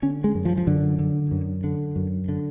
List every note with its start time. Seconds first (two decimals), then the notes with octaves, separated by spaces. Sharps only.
0.02 D3 C#4
0.24 G#3
0.35 F#2
0.45 F3
0.57 F3
0.67 F#2 D3
0.99 D3
1.31 F#2
1.64 D3
1.96 F#2
2.29 D3